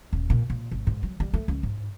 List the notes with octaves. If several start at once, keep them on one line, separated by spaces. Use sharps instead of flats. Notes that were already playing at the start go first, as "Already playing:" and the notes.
D#1
A#2
A#2
G#1
G#2
F#3
G3
A3
C#2
G#2